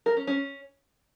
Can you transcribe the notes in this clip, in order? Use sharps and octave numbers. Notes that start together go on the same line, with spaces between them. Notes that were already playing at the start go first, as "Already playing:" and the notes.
A#4
C#4
C#4